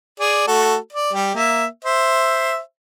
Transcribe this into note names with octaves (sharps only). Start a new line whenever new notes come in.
G#4 D5
A3 F#4 A4
D5
G3 G4
A#3 E5
C5 E5